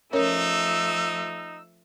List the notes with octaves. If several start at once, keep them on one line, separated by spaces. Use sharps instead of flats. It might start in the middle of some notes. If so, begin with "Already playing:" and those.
F3 A3 C#4 D#4 A#4 C#5 E6